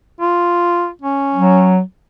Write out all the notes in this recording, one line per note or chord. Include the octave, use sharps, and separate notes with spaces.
F4
C#4
F#3